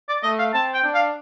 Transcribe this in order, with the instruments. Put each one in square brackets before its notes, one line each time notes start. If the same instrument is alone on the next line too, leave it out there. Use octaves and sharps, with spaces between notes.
[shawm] D5
[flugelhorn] A3 [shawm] D#5
[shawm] F5
[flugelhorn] C4 [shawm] A5
[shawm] G5
[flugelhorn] D4
[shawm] F5